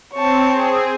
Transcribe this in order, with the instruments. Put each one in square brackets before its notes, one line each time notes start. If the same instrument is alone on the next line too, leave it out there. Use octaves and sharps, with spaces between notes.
[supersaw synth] C4 [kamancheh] C#5 A5
[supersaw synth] C4 G#4